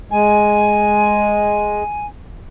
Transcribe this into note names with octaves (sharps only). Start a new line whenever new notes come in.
G#3 G#5